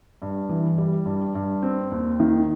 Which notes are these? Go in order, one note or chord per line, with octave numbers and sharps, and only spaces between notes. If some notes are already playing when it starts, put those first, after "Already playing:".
G2
E3
G3
G2
G2
C4
D#2
D#3